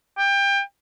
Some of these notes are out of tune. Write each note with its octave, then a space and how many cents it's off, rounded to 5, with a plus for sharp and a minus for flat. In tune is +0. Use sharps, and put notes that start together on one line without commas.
G5 +25